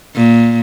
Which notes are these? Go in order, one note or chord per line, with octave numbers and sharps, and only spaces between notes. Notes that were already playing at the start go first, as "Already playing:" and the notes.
A#2